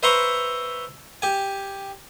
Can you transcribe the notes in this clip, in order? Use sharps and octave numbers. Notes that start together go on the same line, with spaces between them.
B4 C5 E5 A#5 C6 C#6
G4 G#5